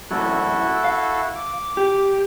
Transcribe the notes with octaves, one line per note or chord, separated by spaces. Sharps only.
A2 E3 F#3 E4 F#4 A4
F5
D6
G4